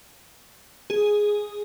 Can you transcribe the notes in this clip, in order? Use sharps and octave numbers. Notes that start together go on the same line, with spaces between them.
G#4